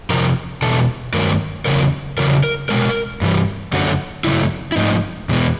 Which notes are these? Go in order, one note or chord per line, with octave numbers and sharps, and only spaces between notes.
F2 C3 F3 A#4
E2 B2 A4
G2 D#3 F#3 A3 A#4
E2 C#3 F#3 A#4
E2 C#3 F#3 A#4
A#4
B2 G#3 A#4
G2 E3 G3
F#2 D3 F#3 A3 F#4
F#2 C#3 F#3 A3 E4
E4
G#2 F3 A3 D#4
E2 B2 G#3